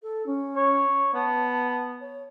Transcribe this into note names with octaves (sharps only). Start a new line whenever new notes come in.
A4
C#4
C#5
B3 A5
C#5